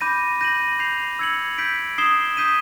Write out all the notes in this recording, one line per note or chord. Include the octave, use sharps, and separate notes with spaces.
B5 D6 G6 A#6 D#7
G6 A#6 D#7 F#7
G6 C7 F7
E6 G#6 C#7 F#7
E6 G6 B6 D7
D#6 G#6 C7 E7 G7
D#6 G6 B6 D#7 G7